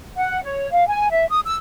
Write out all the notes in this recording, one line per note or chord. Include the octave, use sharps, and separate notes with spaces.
F#5
C#5
F5
G#5
E5
D#6
E6